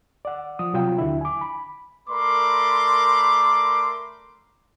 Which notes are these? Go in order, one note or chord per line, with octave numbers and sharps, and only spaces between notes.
D5 F#5
F3 D#6
C3 F#3 F4 G5
D#2 D3 E4
G#5 D6
B5
A3 A#4 D5 B5 C6 D6